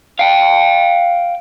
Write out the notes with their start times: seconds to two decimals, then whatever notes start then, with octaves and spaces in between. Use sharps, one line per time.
0.19 F5 G5